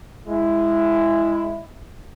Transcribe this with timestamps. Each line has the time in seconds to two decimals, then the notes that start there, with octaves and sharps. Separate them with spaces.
0.27 G#3 E4